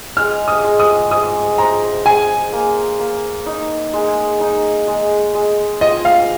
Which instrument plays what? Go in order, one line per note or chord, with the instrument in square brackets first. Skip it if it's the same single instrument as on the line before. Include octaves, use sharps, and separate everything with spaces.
[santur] G#3 [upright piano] F6
[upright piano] D#6
[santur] G#3
[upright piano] D#6
[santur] G#3 [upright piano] D#6
[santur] C5 [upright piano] A#5
[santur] G#4 [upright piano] G#5
[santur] A#3
A#3
D#4
G#3
D#4
G#3
G#3
[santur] F4 [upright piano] D#5
[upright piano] F5